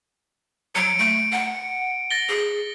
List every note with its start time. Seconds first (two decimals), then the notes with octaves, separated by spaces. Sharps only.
0.75 F#3 C#7 D7
0.99 A3 D7
1.32 F#5
2.10 A6 A#6 G7
2.29 G#4